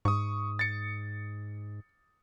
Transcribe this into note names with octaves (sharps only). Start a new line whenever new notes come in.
G#2 C#6 D#6
A6 C#7